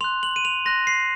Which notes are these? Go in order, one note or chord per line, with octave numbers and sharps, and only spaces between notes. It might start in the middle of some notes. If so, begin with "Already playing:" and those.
C6 F#6 F7
F#7
D#7
F7
C6 F#6 A#6
C7